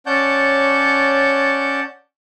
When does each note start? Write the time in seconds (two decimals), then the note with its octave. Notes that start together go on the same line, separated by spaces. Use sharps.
0.06 C#4 C#5 D5 F#5 A5 G6